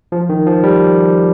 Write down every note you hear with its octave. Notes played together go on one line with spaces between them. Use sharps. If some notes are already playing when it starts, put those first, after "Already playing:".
F3
D#3
F3
G3